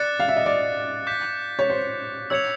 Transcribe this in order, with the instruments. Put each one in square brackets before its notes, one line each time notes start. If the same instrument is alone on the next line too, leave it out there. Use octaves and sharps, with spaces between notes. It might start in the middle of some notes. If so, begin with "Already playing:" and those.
Already playing: [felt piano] D5 [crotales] D6 F#6 A6 C#7
[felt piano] F5
E5
D#5
D5
[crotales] D6 G6 B6
[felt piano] C#5
C5
[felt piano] C#5 [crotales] E6 G#6 C#7 F7